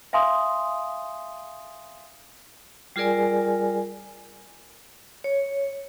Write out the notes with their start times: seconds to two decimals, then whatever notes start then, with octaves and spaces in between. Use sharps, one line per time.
0.13 E5 F5 G#5 C6 D#6
2.96 G3 F4 G#4 A#4 D5 G#5
5.24 C#5